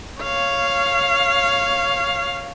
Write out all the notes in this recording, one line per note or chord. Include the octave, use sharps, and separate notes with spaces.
C#5 F5